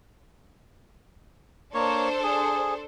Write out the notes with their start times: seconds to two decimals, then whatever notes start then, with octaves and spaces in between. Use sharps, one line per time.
1.74 A#3 D4 A4 C5 C#5
2.23 G#4